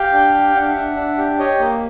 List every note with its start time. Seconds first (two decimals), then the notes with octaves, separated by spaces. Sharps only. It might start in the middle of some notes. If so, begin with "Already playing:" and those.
Already playing: G4 F5 G5
0.13 D4
0.34 G4
0.55 D4 F#5
0.62 F5
0.69 E5 F#5
0.76 D4
0.97 D4
1.18 G4
1.39 G4 C#5 D#5
1.60 A#3